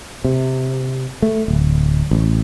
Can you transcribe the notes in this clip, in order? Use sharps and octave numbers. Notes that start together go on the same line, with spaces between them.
C3
A3
D1
A1